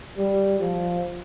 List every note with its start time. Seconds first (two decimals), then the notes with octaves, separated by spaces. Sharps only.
0.18 G3
0.60 F3